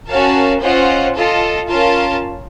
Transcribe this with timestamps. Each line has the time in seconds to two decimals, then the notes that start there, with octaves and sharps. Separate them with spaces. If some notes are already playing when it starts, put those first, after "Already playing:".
0.09 C#4 F#4 A#4 F5 A5
0.62 C#4 F4 C5 D#5 F#5
1.15 F4 A4 D#5 A5
1.69 C#4 F4 A#4 F5 A5